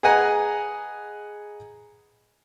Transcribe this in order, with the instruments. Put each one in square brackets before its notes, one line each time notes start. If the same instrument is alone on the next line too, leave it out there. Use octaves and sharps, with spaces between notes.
[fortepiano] G#4 B4 D#5 F#5 G#5 A#5